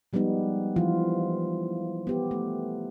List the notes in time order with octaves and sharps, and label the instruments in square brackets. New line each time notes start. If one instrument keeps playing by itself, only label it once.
[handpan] F3 G3 G#3 B3 D#4
E3 F3 F4
B3 G4
A3